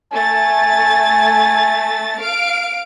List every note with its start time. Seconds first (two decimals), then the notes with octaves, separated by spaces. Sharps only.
0.12 A3 G#5 A6
2.20 F5 D7